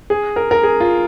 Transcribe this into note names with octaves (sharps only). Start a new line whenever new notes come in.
G#4
A#4
A#4
G#4
F4